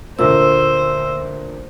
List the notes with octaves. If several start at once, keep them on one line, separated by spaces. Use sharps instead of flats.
D2 A#2 A#3 C5 E6